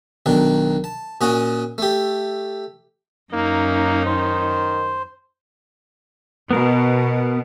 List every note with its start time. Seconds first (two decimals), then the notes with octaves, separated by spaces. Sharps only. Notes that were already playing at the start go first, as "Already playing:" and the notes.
0.26 B1 D#3 D4
0.84 A5
1.21 A#2 C#4 F#4 D#5
1.78 A3 G4
3.33 F#2 A#3 C#4 D#4
4.06 D#3 C5
6.51 B2 B3 A#4